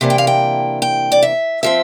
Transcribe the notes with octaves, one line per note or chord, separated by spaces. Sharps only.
C3 E3 A#3 D4
G5
F5
G5
G5
D5
E5
F3 C4 E5